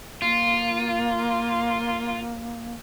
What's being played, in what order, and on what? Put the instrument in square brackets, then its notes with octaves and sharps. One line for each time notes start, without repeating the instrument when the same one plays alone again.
[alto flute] A#3 [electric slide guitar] F4